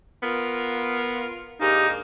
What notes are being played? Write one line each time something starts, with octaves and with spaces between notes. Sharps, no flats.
B3 F4 A#4
G#2 D3 A#3 D#4 G4 A#4